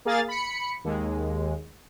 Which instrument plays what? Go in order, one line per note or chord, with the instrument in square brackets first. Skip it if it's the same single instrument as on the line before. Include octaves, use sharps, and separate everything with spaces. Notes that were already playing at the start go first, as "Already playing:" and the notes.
[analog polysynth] A#3 G#4 F5 A6
B5 C#7
D#2 G#3